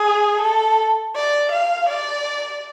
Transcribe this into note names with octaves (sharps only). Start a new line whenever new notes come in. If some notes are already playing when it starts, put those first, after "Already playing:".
Already playing: G#4
A4
D5
F5
D5